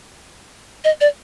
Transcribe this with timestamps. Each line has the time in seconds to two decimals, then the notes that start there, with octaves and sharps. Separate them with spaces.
0.85 D#5
1.01 D5